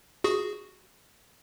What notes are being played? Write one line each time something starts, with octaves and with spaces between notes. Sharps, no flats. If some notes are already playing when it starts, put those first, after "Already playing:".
F#4 G#4